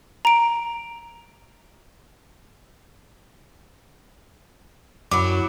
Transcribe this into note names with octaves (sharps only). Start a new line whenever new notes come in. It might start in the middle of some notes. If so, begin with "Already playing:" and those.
A#5 D7
F#2 F#3 E4 D6